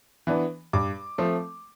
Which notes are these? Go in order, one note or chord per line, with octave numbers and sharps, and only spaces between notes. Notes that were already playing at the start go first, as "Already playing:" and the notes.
E3 B3 D4
G2 D6
F3 A3 C4